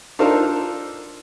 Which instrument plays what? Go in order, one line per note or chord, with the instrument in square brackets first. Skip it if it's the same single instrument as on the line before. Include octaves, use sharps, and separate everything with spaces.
[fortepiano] D4 D#4 F4 A4 A#4 C5